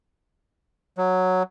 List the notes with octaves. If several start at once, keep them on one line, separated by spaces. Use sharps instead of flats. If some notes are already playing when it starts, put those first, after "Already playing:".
F#3